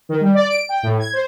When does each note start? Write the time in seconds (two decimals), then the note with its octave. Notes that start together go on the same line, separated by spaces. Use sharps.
0.09 D#3
0.21 G3
0.35 D5
0.49 D7
0.69 G5
0.83 A2
0.99 G#6
1.13 C5